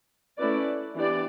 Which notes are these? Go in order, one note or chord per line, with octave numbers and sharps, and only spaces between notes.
A3 C#4 E4 B4 D5
E3 B3 D4 G4 D5